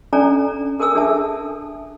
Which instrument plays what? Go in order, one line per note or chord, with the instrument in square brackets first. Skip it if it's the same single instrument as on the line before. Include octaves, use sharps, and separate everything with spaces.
[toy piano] C#4 D4 A4 D5 G#5 A#5
A4 A#4 G#5 D#6 E6
D4 G#4 A4 E5 A5